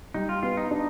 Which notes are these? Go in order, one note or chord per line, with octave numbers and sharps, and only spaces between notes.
G3 D#4
F4
B3 F4
D#4
D4 D#4